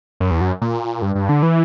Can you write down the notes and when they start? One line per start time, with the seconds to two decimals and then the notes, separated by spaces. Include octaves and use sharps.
0.20 F#2
0.31 E2
0.41 F#2
0.62 A#2
1.02 G2
1.15 G2
1.29 D3
1.43 E3